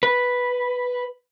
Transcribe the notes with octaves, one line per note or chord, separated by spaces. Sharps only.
B4